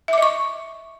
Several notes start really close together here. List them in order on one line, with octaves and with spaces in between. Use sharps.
E5 D6 D#5 C#6